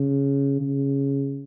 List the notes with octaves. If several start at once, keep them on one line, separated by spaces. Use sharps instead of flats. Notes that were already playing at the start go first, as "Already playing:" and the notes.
Already playing: C#3
C#3